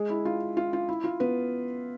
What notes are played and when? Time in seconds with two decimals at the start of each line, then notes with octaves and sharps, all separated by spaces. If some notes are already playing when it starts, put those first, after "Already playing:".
Already playing: G#3 G#4
0.10 E4
0.25 F4
0.57 F4
0.73 F4
0.89 E4
1.04 F4
1.20 B3 B4